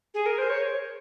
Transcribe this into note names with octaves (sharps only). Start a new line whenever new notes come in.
G#4
A#4
C5
C#5